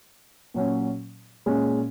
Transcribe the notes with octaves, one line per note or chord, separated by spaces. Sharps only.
A#2 F#3 C#4
A#2 G#3 C#4